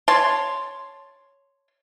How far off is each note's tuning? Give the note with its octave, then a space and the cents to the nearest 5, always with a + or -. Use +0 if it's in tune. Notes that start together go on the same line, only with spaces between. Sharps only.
C#5 +0 A5 +0 C6 +0